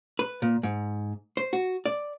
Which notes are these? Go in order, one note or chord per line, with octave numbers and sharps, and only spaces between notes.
B4
A#2
G#2
C5
F#4
D5